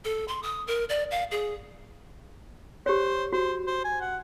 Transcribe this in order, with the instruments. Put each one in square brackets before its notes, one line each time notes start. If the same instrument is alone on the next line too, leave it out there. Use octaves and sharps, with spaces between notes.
[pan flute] A4
C6
D#6
A#4
D5
F5
G#4
[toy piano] G4 C#5 [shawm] C5
[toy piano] F#4 [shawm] C5
[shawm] C5
G#5
F#5